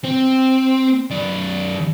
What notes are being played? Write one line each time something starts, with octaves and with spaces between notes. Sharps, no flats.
C4
F#2 D5